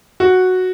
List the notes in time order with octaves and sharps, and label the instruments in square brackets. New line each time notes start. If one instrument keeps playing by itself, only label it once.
[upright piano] F#4